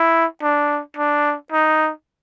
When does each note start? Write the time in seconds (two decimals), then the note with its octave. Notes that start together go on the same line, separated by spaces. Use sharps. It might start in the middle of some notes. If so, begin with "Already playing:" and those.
Already playing: E4
0.42 D4
0.97 D4
1.52 D#4